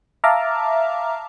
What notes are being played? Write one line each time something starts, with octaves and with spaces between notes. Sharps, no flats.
E5 F5 A5 A#5 D6 F6